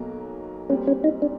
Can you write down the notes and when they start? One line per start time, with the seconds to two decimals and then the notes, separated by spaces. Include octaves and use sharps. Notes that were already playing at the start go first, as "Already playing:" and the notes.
Already playing: B1 B2 F#3 A#3
0.70 A#2 G3 C4 C#4
0.88 C#4
1.04 D#4
1.22 D4